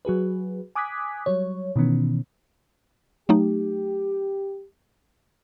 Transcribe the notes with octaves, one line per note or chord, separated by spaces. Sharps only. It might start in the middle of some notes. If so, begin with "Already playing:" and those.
F#3 F#4 G#4 B4
G#5 D6 D#6 F#6 G#6 B6
F#3 G3 C#5
B2 D#3 E3 B3 C#4
F#3 A3 D#4 G4